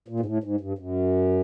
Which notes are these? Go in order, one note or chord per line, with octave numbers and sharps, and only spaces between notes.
A#2
G#2
A2
G#2
G2
F#2